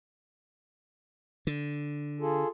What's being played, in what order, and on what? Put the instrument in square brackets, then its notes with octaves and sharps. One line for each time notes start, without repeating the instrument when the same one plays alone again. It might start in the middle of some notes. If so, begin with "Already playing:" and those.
[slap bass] D3
[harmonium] F4 G#4 A4